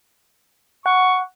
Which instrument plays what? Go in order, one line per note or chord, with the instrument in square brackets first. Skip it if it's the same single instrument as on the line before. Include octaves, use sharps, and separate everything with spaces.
[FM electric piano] F#5 [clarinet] C#6